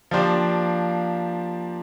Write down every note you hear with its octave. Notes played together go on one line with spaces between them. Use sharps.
F3 A#3 D4 G4 C5